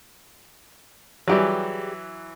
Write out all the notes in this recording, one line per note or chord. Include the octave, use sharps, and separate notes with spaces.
E3 F#3 G3 G4 G#4